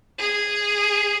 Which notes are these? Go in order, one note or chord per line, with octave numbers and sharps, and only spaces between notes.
G#4